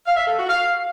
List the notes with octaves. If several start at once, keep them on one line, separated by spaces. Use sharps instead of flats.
F5
E5
A4
F#4
F5